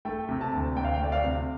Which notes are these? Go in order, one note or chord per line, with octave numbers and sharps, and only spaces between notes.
A3 G5
C3
A5
D2
D2 G5
F5
G5
A3 D5
F5
C3